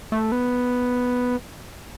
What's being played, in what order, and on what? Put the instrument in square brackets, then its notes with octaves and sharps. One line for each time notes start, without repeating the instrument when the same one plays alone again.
[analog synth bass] A3
B3